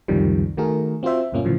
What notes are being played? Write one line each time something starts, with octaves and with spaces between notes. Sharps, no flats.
C#2 F#2 C3 D#3 F3 G3
D#3 A3 F#4 G#4 A#4
C4 F4 F#4 C5 E5
D2 G2 B2 A#3 C#4 F4
A2 C#3 E3 F3